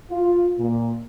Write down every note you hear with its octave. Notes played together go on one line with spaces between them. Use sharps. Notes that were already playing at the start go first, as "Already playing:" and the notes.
F4
A#2